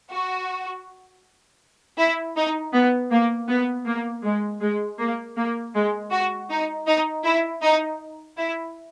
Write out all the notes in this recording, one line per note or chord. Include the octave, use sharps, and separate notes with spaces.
F#4
E4
D#4
B3
A#3
B3
A#3
G#3
G#3
A#3
A#3
G#3
F#4
D#4
D#4
E4
D#4
E4